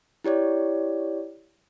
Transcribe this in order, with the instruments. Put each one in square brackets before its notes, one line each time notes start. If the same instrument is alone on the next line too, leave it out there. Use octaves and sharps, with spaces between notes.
[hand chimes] E4 G4 C#5 D5